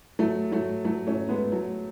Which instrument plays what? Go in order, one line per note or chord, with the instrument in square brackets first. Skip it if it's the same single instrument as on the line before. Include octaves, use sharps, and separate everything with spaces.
[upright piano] F#3 A3
F#3 A3
F#3 A3
A3 C#4
G#3 B3
F#3 A3